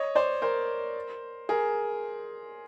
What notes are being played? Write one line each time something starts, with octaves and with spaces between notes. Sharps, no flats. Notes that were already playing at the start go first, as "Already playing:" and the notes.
Already playing: C#5 D#5
C5 D5
A#4 C5
G#4 A#4